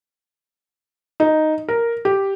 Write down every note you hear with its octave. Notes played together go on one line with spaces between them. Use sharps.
D#4
A#4
G4